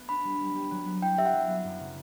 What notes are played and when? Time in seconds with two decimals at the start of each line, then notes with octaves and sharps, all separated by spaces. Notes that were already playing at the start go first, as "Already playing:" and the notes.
Already playing: A3 B3
0.09 D4 B5
0.25 G3
0.40 G3
0.56 G4
0.71 F#3
0.86 B3
1.02 E4 G5
1.17 G4 E5
1.26 F#5
1.33 F#3
1.48 B3
1.64 F#2
1.80 C#3